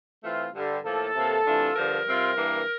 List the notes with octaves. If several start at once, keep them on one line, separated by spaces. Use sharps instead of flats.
E3 A3 C4 F4
G2 D3 G3
A2 F3 A#3 A4
C3 E3 A#3
C3 E3 A3 D4 F4
G2 D3 F3 A#4
C3 G3 C4 F4
G2 E3 A#3